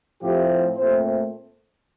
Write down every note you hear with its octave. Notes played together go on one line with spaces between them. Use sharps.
A2 F3 A3 C4 G4
A#2 A3 C4 C5